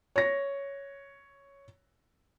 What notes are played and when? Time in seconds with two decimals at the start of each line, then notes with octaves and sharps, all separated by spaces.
0.16 C#5 A#6